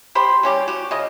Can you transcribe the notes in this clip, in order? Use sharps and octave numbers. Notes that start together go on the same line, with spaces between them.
G4 C5 B5 C6
G3 C#4 G4
F#4 G4
C#3 D#5